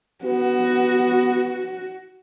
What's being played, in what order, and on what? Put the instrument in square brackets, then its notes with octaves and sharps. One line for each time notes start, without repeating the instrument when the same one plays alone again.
[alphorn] B3 [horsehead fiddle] F#4